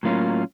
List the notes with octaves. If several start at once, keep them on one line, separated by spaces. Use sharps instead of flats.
A2 F#3 A#3 C#4 F4